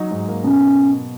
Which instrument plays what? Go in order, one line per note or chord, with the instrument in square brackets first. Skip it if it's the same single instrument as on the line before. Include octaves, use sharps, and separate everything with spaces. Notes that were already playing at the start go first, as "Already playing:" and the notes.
Already playing: [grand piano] F#3 D#4
G#2
A#3
[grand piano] B2 [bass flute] C#4